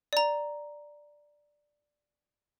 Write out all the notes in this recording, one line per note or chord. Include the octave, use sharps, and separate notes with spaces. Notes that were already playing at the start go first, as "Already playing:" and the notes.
D5 A#5